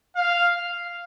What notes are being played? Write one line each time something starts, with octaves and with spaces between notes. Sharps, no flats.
F5